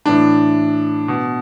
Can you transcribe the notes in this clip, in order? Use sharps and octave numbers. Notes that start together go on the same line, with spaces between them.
A2 E3 D4
B2